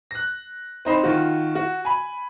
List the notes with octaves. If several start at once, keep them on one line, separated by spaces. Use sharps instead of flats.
F#6 A#6
C4 D#4 C5 B5
D#3 F4 F#4
F#4
G#5 B5